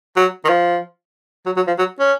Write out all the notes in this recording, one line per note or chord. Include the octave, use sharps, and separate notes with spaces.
F#3
D#3
F3
F#3
F#3
F3
F#3
C#4